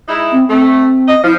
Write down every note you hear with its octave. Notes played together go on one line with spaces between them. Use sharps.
G#3 D#4 E4
C4
A3 C4
D#5
F3 E4